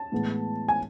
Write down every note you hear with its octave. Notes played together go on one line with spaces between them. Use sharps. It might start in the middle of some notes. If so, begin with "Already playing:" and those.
Already playing: A5
A2 E3 G#3 B3
G#5